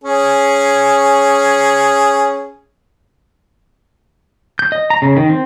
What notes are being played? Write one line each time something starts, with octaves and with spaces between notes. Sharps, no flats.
C#4 G#4
G6
D#5
A#5
C#3
D#3
C4